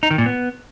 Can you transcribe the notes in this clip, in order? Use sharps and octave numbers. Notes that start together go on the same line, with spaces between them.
D#4
D#3
A#2
B3